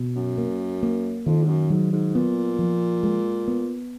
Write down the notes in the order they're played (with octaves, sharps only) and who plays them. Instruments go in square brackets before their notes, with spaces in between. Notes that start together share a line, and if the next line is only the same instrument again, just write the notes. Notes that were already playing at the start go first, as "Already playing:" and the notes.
Already playing: [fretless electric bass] B2
[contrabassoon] F#2
[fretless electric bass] A#3
A#3
[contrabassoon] F2 [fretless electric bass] D#3
[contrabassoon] G#2
F#2
[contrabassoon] G#2 [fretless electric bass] F#3
[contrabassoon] G#2
[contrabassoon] A#2 [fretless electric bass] B3
[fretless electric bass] F3
G#3
B3